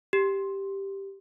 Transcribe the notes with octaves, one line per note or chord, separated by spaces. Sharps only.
G4